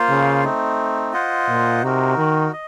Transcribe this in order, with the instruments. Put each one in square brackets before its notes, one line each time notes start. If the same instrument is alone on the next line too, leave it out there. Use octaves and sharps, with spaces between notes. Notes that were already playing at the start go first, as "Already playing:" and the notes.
Already playing: [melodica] A#3 F4 C5 F5
[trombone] C#3
[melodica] A3 C4 D#4
F4 C5 D#5 F#5
[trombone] A#2
[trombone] C3 [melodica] D#4 F#4 A#4
[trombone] D#3
[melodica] D#5